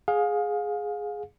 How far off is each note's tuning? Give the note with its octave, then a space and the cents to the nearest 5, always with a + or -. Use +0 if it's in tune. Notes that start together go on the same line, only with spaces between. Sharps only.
G#4 +5 F5 +30